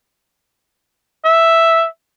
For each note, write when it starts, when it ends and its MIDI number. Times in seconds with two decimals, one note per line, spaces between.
1.25 1.85 76